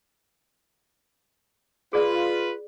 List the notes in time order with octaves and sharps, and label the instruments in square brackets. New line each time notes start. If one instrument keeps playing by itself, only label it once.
[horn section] F4 B4 [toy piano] G#4 D5